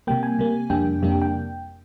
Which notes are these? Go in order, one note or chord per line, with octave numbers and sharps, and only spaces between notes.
C3 G3 A#3 G5
G#5
C3 G3 A#3
F2 C3 G3 A#3 D4 G5
F2 C3 G3 A#3 D4
G5